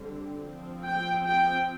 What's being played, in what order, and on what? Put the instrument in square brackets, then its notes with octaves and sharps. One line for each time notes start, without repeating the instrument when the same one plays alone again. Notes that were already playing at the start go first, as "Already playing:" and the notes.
Already playing: [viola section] D3 G3 C4
F3 C4
G5
G5